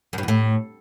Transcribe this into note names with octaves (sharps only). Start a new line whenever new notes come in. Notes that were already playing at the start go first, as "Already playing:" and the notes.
F#2
G2
E2
A2